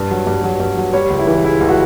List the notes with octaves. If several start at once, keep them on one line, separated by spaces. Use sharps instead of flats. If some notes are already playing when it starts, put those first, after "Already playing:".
Already playing: G2
F#3
G2
F#3
G2
F#3
G3 C#5
C#2
E4
E3
C#3 E4
C#2
F#4